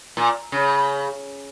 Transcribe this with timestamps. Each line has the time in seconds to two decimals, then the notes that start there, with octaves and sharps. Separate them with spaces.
0.17 A#2
0.52 C#3